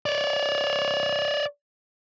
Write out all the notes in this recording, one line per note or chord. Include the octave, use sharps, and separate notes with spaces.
C#5 D5